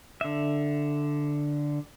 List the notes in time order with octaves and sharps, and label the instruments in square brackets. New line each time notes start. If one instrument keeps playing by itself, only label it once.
[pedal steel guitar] D3 E5